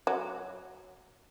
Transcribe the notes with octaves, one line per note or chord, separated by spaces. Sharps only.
F#3